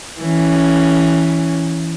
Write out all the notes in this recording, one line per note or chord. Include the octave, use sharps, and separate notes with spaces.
E3 C#4